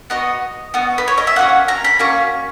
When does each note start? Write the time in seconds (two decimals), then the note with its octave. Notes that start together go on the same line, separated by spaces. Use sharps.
0.10 B3 F#4 D#5
0.74 B3 F#4
0.98 B4
1.08 C#5
1.18 D#5
1.27 E5
1.36 A#3 C#4 F#4 F#5
1.68 A#5
1.84 B5
1.99 A#3 C#4 F#4 C#6